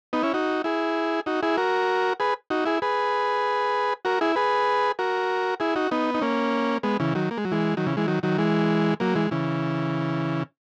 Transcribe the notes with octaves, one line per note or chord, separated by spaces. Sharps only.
B3 D#4
C#4 E4
D#4 F#4
E4 G#4
D#4 F#4
E4 G#4
F#4 A#4
G#4 B4
D#4 F#4
E4 G#4
G#4 B4
F#4 A#4
E4 G#4
G#4 B4
F#4 A#4
E4 G#4
D#4 F#4
B3 D#4
D#4
A#3 C#4
G#3 B3
C#3 E3
D#3 F#3
A#3
G#3
F#3
E3 G#3
D#3 F#3
C#3 E3
E3 G#3
D#3 F#3
D#3 F#3
E3 G#3
F#3 A#3
E3 G#3
C#3 E3